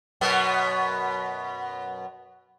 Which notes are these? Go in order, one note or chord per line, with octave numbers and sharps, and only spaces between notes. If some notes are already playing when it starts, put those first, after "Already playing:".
F#2 B2 B3